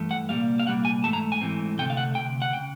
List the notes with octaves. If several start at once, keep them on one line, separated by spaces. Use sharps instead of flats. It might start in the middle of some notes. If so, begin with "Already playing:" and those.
Already playing: G2 E3 A3
F#5
C2 A#2 G3 A#3 F5
F5
C2 A#2 G3 A#3 F#5
G#5
G#2 E3 A3 A5
A#5
G#5
G#2 E3 A3 C4
D2 C3 A3 G5
F5
F#5
D2 C3 G5
F#5
C#3 G5